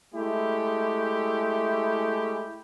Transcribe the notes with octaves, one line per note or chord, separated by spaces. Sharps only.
G#3 A3 E4 G4